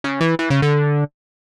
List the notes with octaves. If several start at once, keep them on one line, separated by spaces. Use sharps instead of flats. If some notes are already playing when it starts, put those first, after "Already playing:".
C#3
E3
E3
C#3
D3